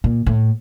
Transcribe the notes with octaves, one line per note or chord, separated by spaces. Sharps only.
A#2
A2